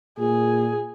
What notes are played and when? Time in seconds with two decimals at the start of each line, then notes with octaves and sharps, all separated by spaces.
0.19 A#2 G#4